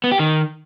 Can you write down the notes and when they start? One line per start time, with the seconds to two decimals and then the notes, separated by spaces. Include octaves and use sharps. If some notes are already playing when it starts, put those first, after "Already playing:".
0.04 B3
0.12 G4
0.19 D#3